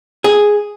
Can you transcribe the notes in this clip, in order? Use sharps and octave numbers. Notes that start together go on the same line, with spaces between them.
G#4